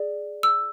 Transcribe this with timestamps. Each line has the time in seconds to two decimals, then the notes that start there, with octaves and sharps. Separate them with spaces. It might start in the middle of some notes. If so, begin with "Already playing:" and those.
Already playing: G#4 D5
0.43 E6